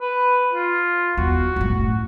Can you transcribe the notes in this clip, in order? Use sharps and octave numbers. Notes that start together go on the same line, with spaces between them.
B4
F4
E2 F#4
F#2 A2